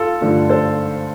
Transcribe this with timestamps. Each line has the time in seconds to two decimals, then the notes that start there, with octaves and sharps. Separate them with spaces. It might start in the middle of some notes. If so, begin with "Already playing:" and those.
Already playing: F4 A4
0.21 G2 D3 F3 A3
0.49 A4 C5